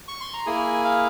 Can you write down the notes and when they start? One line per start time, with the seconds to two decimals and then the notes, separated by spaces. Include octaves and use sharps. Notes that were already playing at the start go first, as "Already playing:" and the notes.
0.08 C#6
0.21 C6
0.33 A#5
0.46 A#3 E4 G#4 G#5
0.85 F5